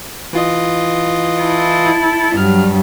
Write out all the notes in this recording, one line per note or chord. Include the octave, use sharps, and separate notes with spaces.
E3 F4 D#5
E4 A4
G2 F#3 F6